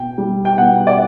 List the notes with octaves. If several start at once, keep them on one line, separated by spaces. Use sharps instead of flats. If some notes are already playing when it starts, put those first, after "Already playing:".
Already playing: B2 G5
G3
G5
B2 F#5
D5